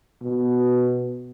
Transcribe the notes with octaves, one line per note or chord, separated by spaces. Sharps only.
B2